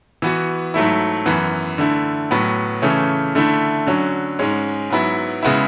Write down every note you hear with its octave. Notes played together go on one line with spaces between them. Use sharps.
E3 B3 F#4
G#2 F#3 A3 E4
F#2 E3 B3
D3 A3 E4
A2 F#3 B3
C#3 E3 A3 C#4
D3 A3 E4
D3 F#3 C#4
G#2 G#3 C#4
G#2 F#3 B3 E4
C#3 G#3 B3 E4